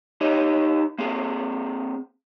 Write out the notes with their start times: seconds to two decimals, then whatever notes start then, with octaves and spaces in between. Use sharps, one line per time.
0.21 D#4 G4 C#5 D#5
0.98 A#3 C4 G#4